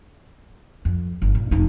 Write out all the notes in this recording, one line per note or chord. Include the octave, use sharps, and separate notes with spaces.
F2
G1
A#2
F1 D#4